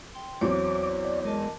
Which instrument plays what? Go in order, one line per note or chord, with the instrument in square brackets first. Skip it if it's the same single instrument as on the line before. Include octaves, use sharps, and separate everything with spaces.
[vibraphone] G5 C6
[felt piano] E2 F#3 C4 [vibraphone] C#5 [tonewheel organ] D6
[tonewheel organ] D5
[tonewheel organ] G#3 [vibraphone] A#4 D#5 A5